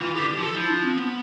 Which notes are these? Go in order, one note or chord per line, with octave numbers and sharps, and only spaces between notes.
E3 F4
D3 G4
G4
F3
A4
F3 E4
D4
C4
B3